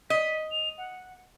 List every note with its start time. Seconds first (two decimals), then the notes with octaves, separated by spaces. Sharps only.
0.10 D#5 B6
0.51 F7
0.78 F#5